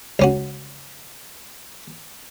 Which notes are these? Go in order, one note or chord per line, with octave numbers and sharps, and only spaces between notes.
C#2 C#4 F#4